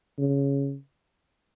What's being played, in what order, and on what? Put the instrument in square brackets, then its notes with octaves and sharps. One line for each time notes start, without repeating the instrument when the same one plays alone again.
[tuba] C#3